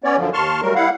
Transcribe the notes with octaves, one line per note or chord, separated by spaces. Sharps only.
B3 C#4 C#5 D5
F#2 D3 F3
D#2 A5 C6 C#6 F6
F#3 G3 A3 A#4
G3 E4 F5 F#5